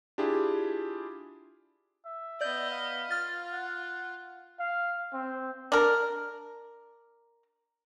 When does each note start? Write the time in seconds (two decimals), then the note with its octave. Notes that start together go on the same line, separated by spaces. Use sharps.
0.18 D4 E4 F4 G4 G#4
2.05 E5
2.41 B3 D5 D#5 G6
2.71 F5
3.11 F4 F6 A6
3.53 F#5
4.59 F5
5.13 C4
5.72 D4 A#4